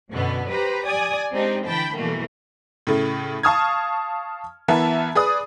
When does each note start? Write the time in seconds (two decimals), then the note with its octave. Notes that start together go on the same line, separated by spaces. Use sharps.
0.12 F#2 B2 D3 B3
0.50 G4 B4 C5 A#5
0.85 D5 G#5 D#6
1.33 G#3 C4 D4 D#4 G4
1.66 D3 E3 G5 A5 B5
1.96 B2 E3 G3 A3 A#3
2.87 A2 C#3 A3
3.43 F5 A5 C#6 D#6 F6 G#6
4.68 E3 B3 A#4 E5 A5
5.15 G#4 B4 D5 D#6